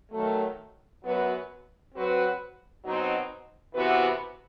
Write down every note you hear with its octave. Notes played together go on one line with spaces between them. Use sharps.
D#3 F#3 A3
F#2 F#3 B3 F#4 B4
F#3 C4 F#4 B4
B2 F#3 C4 D#4
C3 E3 B3 F#4 B4